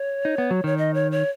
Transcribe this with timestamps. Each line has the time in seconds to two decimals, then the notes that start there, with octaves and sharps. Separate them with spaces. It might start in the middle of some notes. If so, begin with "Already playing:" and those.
Already playing: C#5
0.25 D#4
0.38 B3
0.51 F#3
0.64 D#3 C#5
0.78 D#5
0.94 C#5
1.12 C#5